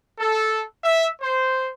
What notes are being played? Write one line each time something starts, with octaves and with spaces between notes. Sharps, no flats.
A4
E5
C5